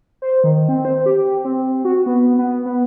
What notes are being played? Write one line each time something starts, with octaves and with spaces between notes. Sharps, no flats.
C5
D#3
C4
C5
G4
C4
F#4
B3
B3
B3